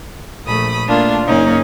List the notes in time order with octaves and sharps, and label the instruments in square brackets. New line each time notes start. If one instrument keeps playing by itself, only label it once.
[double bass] A#1 A3 [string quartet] B5 D#6
[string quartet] A3 D4 F4 [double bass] A#3
[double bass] F#1 D#4 [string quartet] A#3 C#4